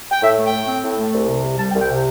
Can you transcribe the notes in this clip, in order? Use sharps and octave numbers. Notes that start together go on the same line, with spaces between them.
G5
A2 E5
A3
G5
A2
C4
A2
A3
C2
C3
C2
G3 A5
G5
C2
G5
C3